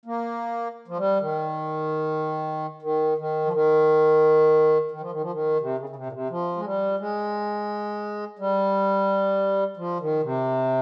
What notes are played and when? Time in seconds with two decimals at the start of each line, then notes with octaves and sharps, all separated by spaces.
0.06 A#3
0.88 F3
0.97 G3
1.21 D#3
2.82 D#3
3.18 D#3
3.45 F3
3.53 D#3
4.91 D#3
5.01 F3
5.12 D#3
5.21 F3
5.32 D#3
5.61 C3
5.78 C#3
5.89 C#3
5.96 C3
6.06 A#2
6.12 C3
6.30 F3
6.57 G#3
6.64 G3
7.00 G#3
8.39 G3
9.77 F3
10.00 D#3
10.23 C3